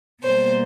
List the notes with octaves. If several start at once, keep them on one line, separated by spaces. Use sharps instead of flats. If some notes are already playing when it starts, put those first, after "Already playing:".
B2 G3 A#3 C5